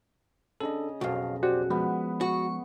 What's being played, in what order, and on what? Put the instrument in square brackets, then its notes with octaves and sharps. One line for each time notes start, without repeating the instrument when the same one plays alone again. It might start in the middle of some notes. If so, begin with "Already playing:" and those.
[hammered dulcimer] C#3 D#5 [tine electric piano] D4 A4
[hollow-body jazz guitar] B1 F2 [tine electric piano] F#4 F5
[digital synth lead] F#4 [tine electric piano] G4 C5 D5
[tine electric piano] F3 G#3 [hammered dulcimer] B3
[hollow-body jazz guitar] F#4 [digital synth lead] C#6